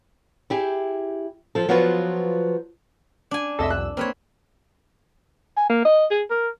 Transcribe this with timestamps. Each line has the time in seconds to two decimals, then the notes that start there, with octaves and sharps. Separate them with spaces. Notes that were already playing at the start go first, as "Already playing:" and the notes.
0.50 E4 G4 G#4
1.55 F3 A4
1.68 F3 F#3 B3 F4 F#4 B4
3.31 D4 G#5
3.59 C2 F2 A4 D#5 E5 E6
3.70 F#6
3.97 A#3 C4 B4 C#5
5.57 G#5
5.70 A#3
5.85 D#5
6.11 G#4
6.31 A#4